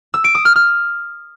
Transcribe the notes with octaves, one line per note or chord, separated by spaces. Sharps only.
E6
D7
D#6
F6
F6